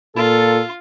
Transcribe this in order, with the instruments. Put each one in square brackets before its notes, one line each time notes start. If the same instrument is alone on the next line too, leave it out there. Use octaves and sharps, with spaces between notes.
[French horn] A#2 [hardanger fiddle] F4 [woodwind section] A4